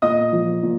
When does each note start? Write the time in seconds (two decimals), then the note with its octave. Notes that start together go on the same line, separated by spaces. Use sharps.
0.02 A#2 D#5 D#6
0.32 F3
0.63 A#2